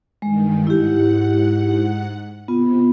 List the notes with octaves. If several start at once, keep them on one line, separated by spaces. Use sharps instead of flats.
G2 D#3 G#3
G#2 E4 G4 F#5
C3 B3 F4